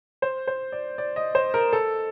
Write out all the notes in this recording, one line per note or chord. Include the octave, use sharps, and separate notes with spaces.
C5
C5
D5
D5
D#5
C5
A#4
A4